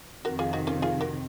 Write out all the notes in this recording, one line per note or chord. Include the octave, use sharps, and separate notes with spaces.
F2 C3 D#3 F#4 A#4
F4 G#4
D#4 F#4
C#4 F4
F4 G#4
F#4 A#4